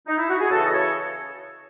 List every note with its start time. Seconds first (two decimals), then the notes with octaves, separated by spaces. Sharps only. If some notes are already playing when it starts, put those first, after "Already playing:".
0.08 D#4
0.18 E4
0.29 F#4
0.40 G#4
0.50 C#3 E3 F#4 A4
0.66 D#5
0.73 A4 C#5